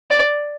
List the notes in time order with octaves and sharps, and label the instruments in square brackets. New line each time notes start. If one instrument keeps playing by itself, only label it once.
[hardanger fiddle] D5